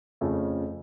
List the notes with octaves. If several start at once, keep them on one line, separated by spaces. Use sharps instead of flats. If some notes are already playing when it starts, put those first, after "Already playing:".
F2 C#3 F3 A3